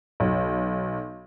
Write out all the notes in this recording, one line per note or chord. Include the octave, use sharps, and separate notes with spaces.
B1